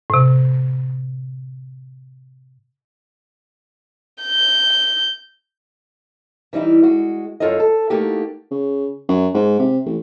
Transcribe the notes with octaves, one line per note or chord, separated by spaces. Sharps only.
A2 C3
G6
E3 G3 D#4 E4
G#3 F#4
F#2 F4 A4 C#5 D#5
A4
A3 A#3 D#4 F#4 G4
C#3
F#2
G#2
C3
A1